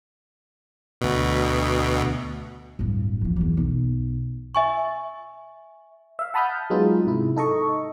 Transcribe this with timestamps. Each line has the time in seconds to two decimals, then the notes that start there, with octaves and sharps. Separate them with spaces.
1.01 D2 B2
2.79 D1 G2
3.21 F2 E3
3.36 E2 F#3
3.57 B1
4.55 E5 G#5 C#6
6.19 E5 F5
6.34 F#5 A5 B5 D#6 F6 G6
6.70 F#3 G#3 B3 D#4 F4
7.05 G#2 C3 E4
7.36 D#4 A4 D#5 C#6